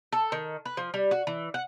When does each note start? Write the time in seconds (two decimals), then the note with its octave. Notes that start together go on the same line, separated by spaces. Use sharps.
0.13 A4
0.32 D#3
0.65 B4
0.77 F3
0.94 G3
1.11 F#4
1.27 E3
1.54 F#5